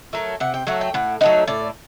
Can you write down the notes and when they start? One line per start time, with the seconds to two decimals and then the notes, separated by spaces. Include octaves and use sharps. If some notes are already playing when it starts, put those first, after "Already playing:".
0.13 F#3 A3 A#4
0.40 C3 F#5
0.54 G5
0.67 F#3 A3 F#5
0.81 G5
0.94 A2 F#5
1.21 F#3 A3 D#4 F#5
1.48 A2 D5